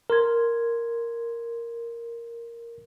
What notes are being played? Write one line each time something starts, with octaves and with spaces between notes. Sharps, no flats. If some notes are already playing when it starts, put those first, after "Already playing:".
A#4 C6 G#6